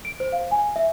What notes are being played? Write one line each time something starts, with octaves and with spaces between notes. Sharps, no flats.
D7
C5
F5
G#5
E5